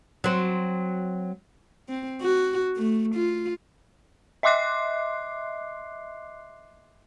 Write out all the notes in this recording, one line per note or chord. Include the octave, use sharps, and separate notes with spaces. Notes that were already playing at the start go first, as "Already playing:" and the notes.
F#3 C4
C4
F#4
A3
F4
D#5 E5 C6 D6 F#6 C7